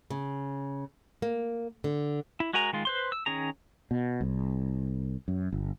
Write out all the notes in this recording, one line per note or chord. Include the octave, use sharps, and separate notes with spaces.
C#3
A#3
D3
E4
G#3 F#4 A#4 G#5 A#5
D#3 G#3 F4
B4 C5 C6
E6
D#3 C#4 G#4 A#5
B2
C2
F#2
G1